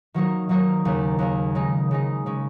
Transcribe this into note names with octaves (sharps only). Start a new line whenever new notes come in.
D#3 F#3 A#3 D#4 A#4
D#3 F#3 A#3 D#4 A#4
D#2 C#3 A#3
D#2 C#3 A#3
C#3 G#3 D#4
C#3 G#3 D#4
C#3 G#3 C#4